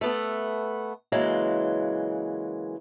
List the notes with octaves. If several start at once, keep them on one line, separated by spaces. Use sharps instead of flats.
A3 B3 A4
C#3 E3 F#3 G#3 A#3